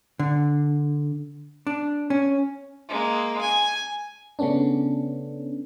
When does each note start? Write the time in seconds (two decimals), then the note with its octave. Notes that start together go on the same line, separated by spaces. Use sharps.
0.19 D3
1.67 D4
2.10 C#4
2.89 G#3 A#3
3.41 G#5
4.39 C#3 A3 B3 C#4 D4